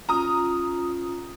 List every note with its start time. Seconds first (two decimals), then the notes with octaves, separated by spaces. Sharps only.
0.09 C#4 F4 A#5 D#6